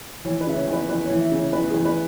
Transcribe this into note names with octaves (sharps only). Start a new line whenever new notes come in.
E3 C#5
B4
C#3 E5
C#5
E2 B4
E2 B4
E3 C#5
E5
C#3
C#5
E2 B4
G#4
E2
B4